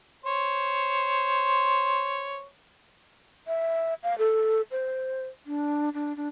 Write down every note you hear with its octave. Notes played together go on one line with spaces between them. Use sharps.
C5 C#5
E5
F5
A4
C5
D4
D4
D4